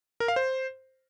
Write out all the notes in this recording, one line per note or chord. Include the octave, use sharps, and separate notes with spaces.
A#4
F5
C5